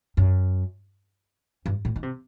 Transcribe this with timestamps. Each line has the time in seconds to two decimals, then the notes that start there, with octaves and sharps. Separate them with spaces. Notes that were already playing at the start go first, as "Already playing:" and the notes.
0.17 F#2
1.66 G2
1.85 A2
1.96 D#3
2.03 C3